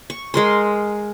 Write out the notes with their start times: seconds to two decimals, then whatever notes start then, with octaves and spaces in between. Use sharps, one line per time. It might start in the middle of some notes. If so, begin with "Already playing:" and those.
0.10 C#6
0.34 G#3 A#4 C6